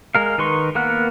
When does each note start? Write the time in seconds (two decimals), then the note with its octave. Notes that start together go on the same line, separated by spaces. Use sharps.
0.15 G#3 A#4 F5
0.38 D#3 D#4 B4 C6 C#6
0.75 A#3 B3 A#4 F#5 F#6